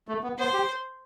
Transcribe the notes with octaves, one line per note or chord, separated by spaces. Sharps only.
A3
B3
B3 C5
G4